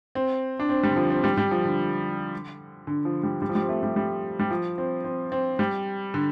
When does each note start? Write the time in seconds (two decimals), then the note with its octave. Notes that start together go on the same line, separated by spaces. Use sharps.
0.15 C4
0.59 D4
0.69 C4
0.83 G3
0.90 D3
0.96 F3
1.10 C4
1.24 G3
1.37 G3
1.51 F3
1.65 D3
2.87 D3
3.05 F3
3.23 G3
3.42 G3
3.49 F3
3.55 G3
3.62 C4
3.69 A3
3.83 G3
3.96 G3
4.40 G3
4.50 F3
4.78 C4
5.04 C4
5.32 C4
5.59 G3
6.14 D3